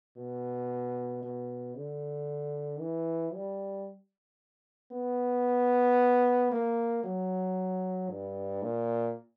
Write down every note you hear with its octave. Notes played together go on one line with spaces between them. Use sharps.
B2
B2
D3
E3
G3
B3
A#3
F#3
G2
A#2